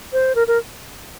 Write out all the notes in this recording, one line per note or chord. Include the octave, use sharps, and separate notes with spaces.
C5
A#4
A#4